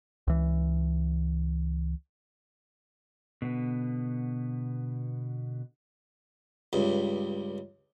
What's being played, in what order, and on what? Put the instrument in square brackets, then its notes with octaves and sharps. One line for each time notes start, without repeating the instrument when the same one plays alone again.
[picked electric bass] C#2 E3
[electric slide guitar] B2 D3 B3
[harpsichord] C#2 G2